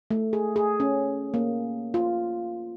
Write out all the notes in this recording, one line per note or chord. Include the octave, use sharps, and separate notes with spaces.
A3
G#4
G#4
C#4
A#3
F4